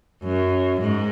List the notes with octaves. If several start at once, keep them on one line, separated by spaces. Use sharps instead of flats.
F#2
G#2